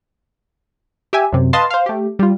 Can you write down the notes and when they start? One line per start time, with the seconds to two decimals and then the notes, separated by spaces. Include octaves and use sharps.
1.13 G4 E5 G#5
1.33 F#2 C3
1.53 B4 D#5 F5 A5 C6
1.70 C5 F5
1.86 A3 G4
2.19 G3 F4